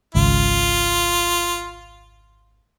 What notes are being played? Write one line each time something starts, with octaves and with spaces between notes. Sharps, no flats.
G#1 C#2 C#3 F4